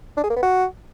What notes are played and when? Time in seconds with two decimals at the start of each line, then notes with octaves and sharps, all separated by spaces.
0.17 D4
0.24 G#4
0.30 A#3
0.36 B3
0.43 F#4